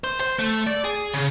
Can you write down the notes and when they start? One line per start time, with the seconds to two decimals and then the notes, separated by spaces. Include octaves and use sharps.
0.04 C5
0.20 C5
0.39 A3
0.67 D5
0.84 G#4
1.13 C#3